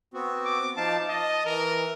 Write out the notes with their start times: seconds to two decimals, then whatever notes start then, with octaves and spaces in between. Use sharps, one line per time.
0.14 B3 C4 F#4
0.45 D6
0.77 F3 D#4 F5 A5
1.09 D#5 A5
1.45 E3 A#4